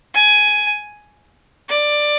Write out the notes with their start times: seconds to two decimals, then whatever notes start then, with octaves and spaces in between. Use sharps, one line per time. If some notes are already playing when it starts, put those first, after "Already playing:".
0.14 G#5
1.69 D5